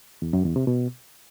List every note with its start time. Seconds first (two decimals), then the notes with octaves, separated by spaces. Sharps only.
0.22 E2
0.33 F#2
0.45 E2
0.56 C3
0.67 B2